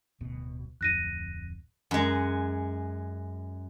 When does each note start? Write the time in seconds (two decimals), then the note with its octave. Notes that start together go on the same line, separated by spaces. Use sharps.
0.21 D1 B2
0.81 D1 F2 F#6 A#6 D#7
1.91 F#2 G#3